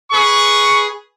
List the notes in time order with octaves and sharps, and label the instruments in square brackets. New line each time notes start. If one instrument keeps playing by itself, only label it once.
[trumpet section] G#4 B4 C#6